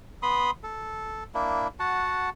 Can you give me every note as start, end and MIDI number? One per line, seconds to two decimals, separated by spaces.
0.23 0.51 59
0.23 0.51 83
0.23 0.51 84
0.23 0.51 87
0.63 1.24 69
1.34 1.68 58
1.34 1.68 62
1.34 1.68 64
1.80 2.30 66
1.80 2.30 78
1.80 2.30 81